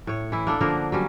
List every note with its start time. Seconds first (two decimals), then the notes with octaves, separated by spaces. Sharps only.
0.07 A2 C#5
0.32 E3 E4
0.47 A#3 D4 A4
0.61 D3 F3 A#3 A#4
0.92 F#3 G3 C#4